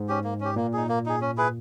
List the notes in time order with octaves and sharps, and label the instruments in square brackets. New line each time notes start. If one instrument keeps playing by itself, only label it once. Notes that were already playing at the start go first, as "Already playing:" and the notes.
Already playing: [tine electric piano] G#2
[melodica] C#4 G4
A#3
C#4 G4
[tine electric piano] A#2 [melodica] A#3
[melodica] D#4 G#4
A#3
D#4 G#4
C#4
E4 G#4 B4